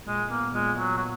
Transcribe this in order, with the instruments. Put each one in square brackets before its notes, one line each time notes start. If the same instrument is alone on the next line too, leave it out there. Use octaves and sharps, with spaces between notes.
[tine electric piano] A#2 [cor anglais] G#3
[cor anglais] A#3 [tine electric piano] B3
[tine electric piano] A#2 [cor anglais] G#3
[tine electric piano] A#2 [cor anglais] F#3
[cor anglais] F#3